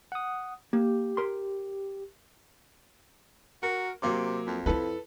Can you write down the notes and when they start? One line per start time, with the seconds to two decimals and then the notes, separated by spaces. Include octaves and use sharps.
0.12 F#5 D#6
0.73 A#3 G4
1.17 A#4 C6
3.63 F#4 A#4
4.02 C3 F#3 A#3 D6
4.46 F2
4.66 D#4 E4 A4 B4